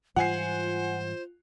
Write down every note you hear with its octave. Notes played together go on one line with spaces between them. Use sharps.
G#2 E3 G3 F4 C5 F#5 G#5 C7